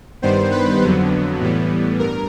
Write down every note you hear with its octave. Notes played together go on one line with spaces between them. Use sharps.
G2 D#3 G3 B3 C5
B4
F2 D3 F#3 B3
A2 E3 G3 B3
G2 A#4